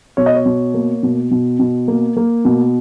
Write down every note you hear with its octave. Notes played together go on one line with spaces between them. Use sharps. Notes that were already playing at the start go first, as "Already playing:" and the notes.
B2 C#5
D#5
C#5
B2
A#3
B2
B2
B2
A#3
A#3
B2